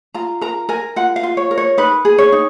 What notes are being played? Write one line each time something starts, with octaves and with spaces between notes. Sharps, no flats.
F4 A#5
A#4 A#5
A#4 G#5
F4 F#5
F5
F4
C#5
A#4
C#5
D#4 B4
G#4
C#5
D#4